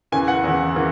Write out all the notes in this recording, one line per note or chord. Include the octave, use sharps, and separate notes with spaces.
E2 C#3 E3 G#5
F#5
E2 C#3 E3
C#3 E3